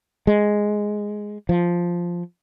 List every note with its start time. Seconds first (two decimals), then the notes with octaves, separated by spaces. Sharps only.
0.27 G#3
1.49 F3